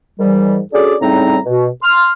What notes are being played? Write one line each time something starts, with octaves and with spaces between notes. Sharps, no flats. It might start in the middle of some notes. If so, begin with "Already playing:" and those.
G#2 D#3 E3 G3
C#4 D4 F#4 G#4 A4 D5
A2 C#3 G3 C4 D#4 A#5
B2
C6 F6